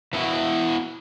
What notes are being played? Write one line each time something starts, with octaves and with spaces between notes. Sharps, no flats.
E3 A3 B3 C#4 E4 F#4